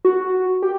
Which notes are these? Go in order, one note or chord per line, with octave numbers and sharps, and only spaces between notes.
F#4
G4